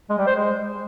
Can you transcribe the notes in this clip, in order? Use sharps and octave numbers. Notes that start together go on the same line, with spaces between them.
G#3
G3
C5
G#3